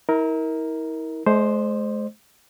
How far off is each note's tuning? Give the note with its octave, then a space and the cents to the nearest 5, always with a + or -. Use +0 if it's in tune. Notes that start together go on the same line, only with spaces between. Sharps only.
E4 -40 A#4 +0
G#3 +45 C5 +0 D#5 -45